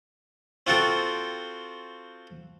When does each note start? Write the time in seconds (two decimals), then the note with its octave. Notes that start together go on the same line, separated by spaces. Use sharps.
0.67 C4 F4 F#4 A4 G5